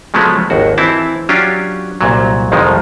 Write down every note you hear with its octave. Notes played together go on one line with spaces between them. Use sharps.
C#3 F3 F#3 G#3 A3 B3
G#1 D#2 F#4
E3 C4 E4 A5
F#3 C#4 D4 F4 G4
C2 A#2 F#3
C2 F2 D#3 F3 G#3